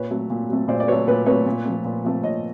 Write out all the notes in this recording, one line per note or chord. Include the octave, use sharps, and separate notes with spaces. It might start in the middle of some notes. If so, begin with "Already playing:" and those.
Already playing: A#2 B4 C#5
F#3 A3
A#2
F#3 A3
A#2 C5 D5
D5
F#3 A3 B4 C#5
A#2 B4 C#5
F#3 A3 B4 C#5
A#2
F3 A3
A#2
F3 A3
A#2 C#5 D#5